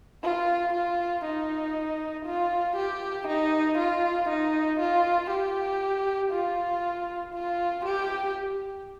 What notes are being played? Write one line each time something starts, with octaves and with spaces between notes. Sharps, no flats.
F4
F4
D#4
F4
G4
D#4
F4
D#4
F4
G4
F4
F4
G4